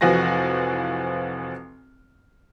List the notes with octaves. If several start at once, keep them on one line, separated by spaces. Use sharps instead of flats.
F1 E3 F3 F#4 G#5 A#6